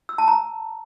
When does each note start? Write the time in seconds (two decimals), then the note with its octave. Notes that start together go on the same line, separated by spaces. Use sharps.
0.09 E6
0.18 A5
0.28 A#5